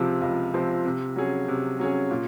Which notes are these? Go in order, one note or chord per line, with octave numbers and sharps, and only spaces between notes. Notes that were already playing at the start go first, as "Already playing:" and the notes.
Already playing: C#2 C3 F3 C4
C#2
C3 F3 C4
C3
F#3 C#4 G#4
C3
F#3 C#4 G#4
A#2